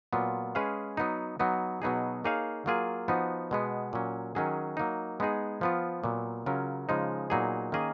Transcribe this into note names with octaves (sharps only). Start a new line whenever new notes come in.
A#2 F#3 B3 F4
G#3 C#4 G#4 B4 F5
F#3 B3 D#4
F#3 B3 D#4
B2 F#3 B3 D#4 G#4
A#3 D#4 G#4 C#5 F5
F#3 A#3 F4 G#4
F3 B3 D#4 F#4
B2 G#3 B3
A#2 F#3 C#4
D#3 F#3 C#4 G#4
F#3 A#3 D#4
G#3 B3 D#4 G#4
F3 B3 F4
A#2 F#3 B3
C#3 F#3 C#4 F4 A#4
C#3 F3 G#3 D#4
A#2 F#3 B3 D#4 G#4
D#3 A#3 C#4 G#4 D#5